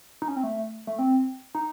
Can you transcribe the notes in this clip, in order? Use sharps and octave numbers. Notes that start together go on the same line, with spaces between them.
D#4
C#4
C4
A3
A3
C4
D#4